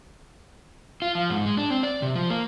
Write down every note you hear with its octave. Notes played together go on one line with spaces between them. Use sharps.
F4
F3
G#2
G#3
D4
C4
D5
C3
F3
A#3